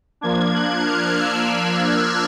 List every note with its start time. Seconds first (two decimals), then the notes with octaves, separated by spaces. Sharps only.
0.21 F3 A#3 D4 G#6
0.54 F#6
0.86 F6
1.19 E6
1.50 F6
1.83 F#6